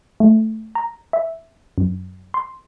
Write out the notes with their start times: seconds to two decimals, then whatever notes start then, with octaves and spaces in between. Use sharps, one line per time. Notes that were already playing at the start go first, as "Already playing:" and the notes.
0.20 A3
0.75 A#5
1.13 E5
1.78 F#2
2.34 C6